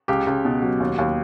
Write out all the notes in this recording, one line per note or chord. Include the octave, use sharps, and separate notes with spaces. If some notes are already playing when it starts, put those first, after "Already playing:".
C#2 G4
C#2
B2
F#3
D#2
D#2